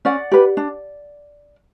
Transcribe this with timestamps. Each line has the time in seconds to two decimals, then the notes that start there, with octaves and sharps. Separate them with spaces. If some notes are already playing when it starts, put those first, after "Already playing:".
0.05 C#4 D5 F#5
0.31 G4 B4
0.57 D4